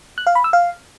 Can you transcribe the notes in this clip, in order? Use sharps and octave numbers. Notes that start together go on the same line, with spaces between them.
F#6
F5
B5
E6
F5